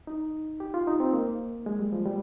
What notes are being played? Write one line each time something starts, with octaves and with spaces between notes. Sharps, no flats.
D#4
G4
F4
D#4
C4
A#3
G#3
G3
F3
G3